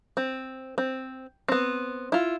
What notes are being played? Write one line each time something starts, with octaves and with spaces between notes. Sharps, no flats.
C4
C4
B3 C4
E4 F4